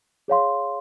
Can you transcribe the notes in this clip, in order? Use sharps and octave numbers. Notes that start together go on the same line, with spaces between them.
G#4 C#5 F5 C6